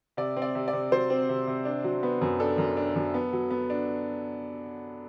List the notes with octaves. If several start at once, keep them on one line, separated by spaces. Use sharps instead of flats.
C3 D5
C4
D5
C3
D5
C3
F#3 C5
C4
C3
C3
D4
F#3
B3
F#2
D4 A4
F#2
D4
F#2
B3
F#3
B3
D4